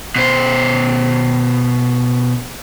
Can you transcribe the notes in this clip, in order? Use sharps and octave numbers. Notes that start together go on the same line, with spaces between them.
B2 C5